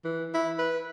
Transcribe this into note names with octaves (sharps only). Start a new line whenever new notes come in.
E3
E4
B4